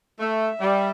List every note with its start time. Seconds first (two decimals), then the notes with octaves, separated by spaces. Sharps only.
0.19 A3 E5
0.61 G3